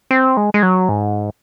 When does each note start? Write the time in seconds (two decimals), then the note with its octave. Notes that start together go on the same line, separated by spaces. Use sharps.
0.11 C4
0.37 G#3
0.54 G#3
0.63 F#3
0.89 G#2